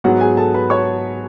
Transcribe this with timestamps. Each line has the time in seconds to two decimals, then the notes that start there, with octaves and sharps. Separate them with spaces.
0.04 G#2 F#3 B3 F#4 F#5
0.21 G#4 G#5
0.37 A4 A5
0.54 B4 B5
0.70 C#5 C#6